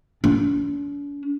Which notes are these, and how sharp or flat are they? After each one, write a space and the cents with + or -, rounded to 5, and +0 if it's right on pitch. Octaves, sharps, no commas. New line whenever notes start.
D4 -45